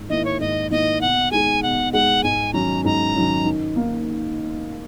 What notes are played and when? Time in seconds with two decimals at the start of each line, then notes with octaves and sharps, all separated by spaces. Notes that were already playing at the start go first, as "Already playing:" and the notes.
Already playing: G#2
0.09 D#3 A#3 E4 D#5
0.25 C#5
0.40 G#2 D#5
0.70 D#3 A#3 E4 D#5
1.01 B2 F#5
1.31 G#3 D#4 G#4 G#5
1.63 B2 F#5
1.93 G#3 D#4 G#4 F#5
2.23 G#2 G#5
2.53 D#3 F#3 C#4 A#5
2.84 G#2 A#5
3.15 D#3 F#3 C#4
3.45 D#3
3.76 A#3 D#4